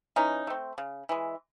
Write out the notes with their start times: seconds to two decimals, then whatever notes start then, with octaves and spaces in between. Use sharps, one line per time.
0.16 E3 C#4 D#4
0.47 A3 C4
0.78 C#3
1.09 E3 G#3